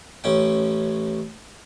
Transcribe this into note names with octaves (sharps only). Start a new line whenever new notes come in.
A1 C#4 G5